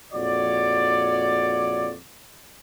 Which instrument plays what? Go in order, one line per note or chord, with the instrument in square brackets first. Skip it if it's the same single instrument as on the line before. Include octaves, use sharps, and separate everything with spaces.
[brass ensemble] A#1 F2 F#4 C#5 D5